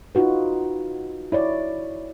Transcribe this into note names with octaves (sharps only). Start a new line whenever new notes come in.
D#4 F4 F#4 B4
E4 C#5 D5